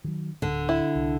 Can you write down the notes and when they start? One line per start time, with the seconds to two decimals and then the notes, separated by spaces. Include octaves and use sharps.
0.04 D#3 F#3
0.42 D1 D3
0.69 E4
0.95 C2